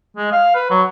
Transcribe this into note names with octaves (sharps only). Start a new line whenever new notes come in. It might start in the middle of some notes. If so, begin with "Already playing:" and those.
G#3
F5
B4
F#3